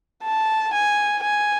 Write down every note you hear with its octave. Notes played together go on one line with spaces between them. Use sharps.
A5
G#5
G#5